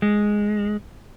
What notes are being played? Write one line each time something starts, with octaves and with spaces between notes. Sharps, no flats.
G#3